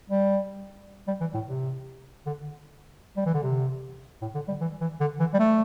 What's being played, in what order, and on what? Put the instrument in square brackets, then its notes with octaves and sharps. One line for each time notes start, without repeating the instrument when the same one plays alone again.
[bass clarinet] G3
G3
E3
A2
C3
D3
G3
E3
D3
C3
A2
D3
G3
E3
E3
D3
E3
G3
A3